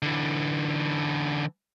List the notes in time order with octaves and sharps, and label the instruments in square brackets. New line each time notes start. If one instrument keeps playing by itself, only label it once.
[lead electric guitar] D3 E3